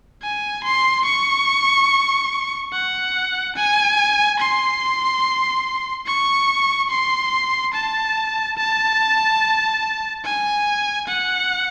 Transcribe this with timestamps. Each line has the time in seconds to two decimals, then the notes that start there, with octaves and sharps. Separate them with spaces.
0.22 G#5
0.64 C6
1.05 C#6
2.73 F#5
3.56 G#5
4.40 C6
6.07 C#6
6.90 C6
7.74 A5
8.58 A5
10.24 G#5
11.08 F#5